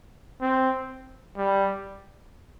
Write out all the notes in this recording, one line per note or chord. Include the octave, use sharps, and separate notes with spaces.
C4
G3